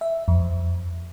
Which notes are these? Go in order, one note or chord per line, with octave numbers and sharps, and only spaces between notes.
E5
F2